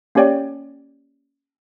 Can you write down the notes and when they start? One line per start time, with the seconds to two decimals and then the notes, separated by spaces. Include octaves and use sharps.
0.15 A#3 C#4 G4 C#5 D5 G5